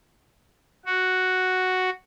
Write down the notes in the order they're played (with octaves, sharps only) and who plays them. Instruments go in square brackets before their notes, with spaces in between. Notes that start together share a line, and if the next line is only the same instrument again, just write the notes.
[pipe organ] F#4